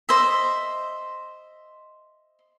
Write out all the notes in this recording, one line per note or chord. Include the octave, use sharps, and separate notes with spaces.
C5 D#5 E5